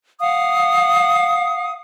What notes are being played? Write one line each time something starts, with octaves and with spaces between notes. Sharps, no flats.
F5 F#5 D#6